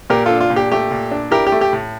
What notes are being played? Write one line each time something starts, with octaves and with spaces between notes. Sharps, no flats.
A#2 G4 A#4
D4 F4 A4
F4
A#2
G4
A3 G4
A#2
D4
E4 G4 A#4
G4
A3
G4
A2